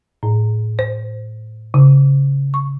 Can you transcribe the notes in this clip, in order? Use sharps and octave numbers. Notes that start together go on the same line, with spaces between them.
A2
C5
C#3
C#6